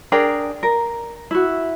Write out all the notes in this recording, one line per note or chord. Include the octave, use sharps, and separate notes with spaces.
D4 G#4 A#4 G5
A#4
E4 F#4